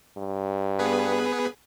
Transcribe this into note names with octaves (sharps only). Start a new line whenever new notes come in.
G2
B3 G#4 B4